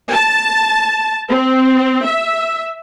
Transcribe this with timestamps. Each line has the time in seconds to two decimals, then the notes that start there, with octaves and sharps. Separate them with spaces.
0.12 A5
1.30 C4
2.07 E5